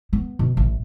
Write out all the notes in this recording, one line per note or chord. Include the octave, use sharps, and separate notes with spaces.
B3
B2
A1